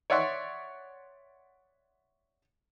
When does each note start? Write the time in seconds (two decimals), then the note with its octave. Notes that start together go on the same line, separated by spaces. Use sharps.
0.10 C#5 D5 E5 F#5 C6 C#6